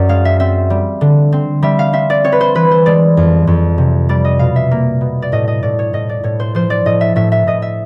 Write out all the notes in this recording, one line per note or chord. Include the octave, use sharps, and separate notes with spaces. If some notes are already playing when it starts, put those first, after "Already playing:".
Already playing: F#2 D5
G#3 F5
E5
C4 E5
G3
D3
C4
G3 E5
F5
C4 E5
D5
C4 C#5
B4
C5
E3 B4
C5
G#3 D5
F2
F2
C3
G3 D5
D#5
B2 F5
E5
A#3
B2
D5
A2 D#5
D#5
A2 D5
C#5
A2 D#5
D5
A2 C#5
C5
F3 C5
D5
A2 D#5
E5
A2 E5
E5
A2 D#5
E5